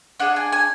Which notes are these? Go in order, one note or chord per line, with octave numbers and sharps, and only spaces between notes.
D4 G#4 F#5
G#5
G#5